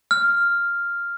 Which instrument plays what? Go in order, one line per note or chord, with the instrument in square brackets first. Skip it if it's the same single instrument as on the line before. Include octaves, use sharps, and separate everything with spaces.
[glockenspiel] F6